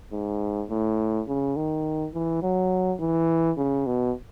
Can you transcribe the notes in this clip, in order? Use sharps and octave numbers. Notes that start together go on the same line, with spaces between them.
G#2
A2
C#3
D#3
E3
F#3
E3
C#3
B2